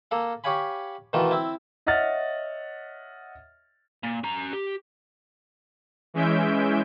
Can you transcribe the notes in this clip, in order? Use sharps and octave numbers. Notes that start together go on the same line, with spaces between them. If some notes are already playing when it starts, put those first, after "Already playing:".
A#3 A4 F5
G4 C#5 F5 G#5 B5
B2 D#3 E3 A3 F4
C4 E4
C#5 D#5 E5 F#5 F6 A6
A#2
C#4 A#5
G4
E3 G#3 C#4 E5 G6 D7